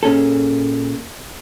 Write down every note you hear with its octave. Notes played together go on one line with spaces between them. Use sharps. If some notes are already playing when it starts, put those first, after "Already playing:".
A#2 C#4 G#4 A4